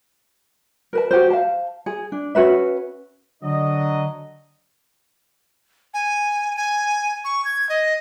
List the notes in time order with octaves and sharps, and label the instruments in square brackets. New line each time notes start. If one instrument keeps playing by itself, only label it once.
[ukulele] A#4 B4 A5
F#4 G4 B4 C5
F5 A5
G#4
D4
C#4 F#4 B4 E5
[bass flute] D3 [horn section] F#3 D4 D#5
[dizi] G#5
G#5
C#6
G#6
D#5